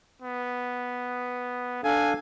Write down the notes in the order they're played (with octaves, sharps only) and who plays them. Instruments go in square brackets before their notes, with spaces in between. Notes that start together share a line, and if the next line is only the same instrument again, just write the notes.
[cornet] B3
[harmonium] D4 A4 F5 [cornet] G#5